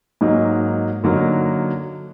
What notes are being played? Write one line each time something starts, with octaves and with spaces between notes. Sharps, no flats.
G#2 F#3 A#3 D#4
D3 F#3 A#3 D#4 A#4